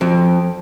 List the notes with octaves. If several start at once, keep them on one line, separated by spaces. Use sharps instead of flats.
F2